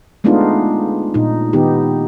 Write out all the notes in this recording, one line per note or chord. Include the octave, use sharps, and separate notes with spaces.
G#3 A3 B3 D4 D#4 F4
A#2 D#4
D#3 B3 D#4 G4